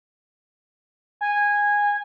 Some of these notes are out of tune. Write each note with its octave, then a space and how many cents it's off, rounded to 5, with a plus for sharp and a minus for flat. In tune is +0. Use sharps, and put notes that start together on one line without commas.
G#5 -15